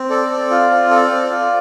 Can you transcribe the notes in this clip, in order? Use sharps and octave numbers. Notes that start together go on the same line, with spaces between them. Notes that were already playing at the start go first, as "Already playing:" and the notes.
Already playing: C4
A4 D5
C4
F4
C4
A4 D5
C4
F4